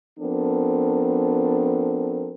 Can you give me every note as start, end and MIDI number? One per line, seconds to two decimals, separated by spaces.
0.19 2.35 53
0.19 2.35 59
0.19 2.35 60
0.19 2.35 62
0.19 2.35 69
0.19 2.35 70